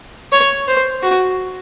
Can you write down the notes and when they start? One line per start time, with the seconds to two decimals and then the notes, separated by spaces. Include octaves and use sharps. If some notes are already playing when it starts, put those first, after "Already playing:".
0.32 C#5
0.68 C5
1.03 F#4